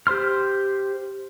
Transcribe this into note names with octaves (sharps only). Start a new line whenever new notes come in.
G4 C5 C6 F6